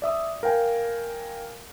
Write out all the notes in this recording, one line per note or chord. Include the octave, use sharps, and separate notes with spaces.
D5 E5 D#6
A#4 F5 G5 G#5